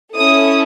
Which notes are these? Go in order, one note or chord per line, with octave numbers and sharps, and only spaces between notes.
C#4 E4 A4 D#6